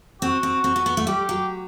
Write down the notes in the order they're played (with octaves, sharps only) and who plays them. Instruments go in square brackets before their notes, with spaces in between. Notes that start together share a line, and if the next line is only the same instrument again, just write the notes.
[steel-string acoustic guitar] C4 [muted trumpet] F#4
[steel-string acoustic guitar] C4
C4
B3
B3
A3
[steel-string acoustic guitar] G3 [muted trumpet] G4
[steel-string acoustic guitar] F#3